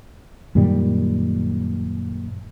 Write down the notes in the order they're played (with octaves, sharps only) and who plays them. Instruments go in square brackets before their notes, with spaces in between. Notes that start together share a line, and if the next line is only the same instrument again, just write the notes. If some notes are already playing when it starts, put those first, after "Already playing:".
[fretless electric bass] F#2 A#2 D#3 G3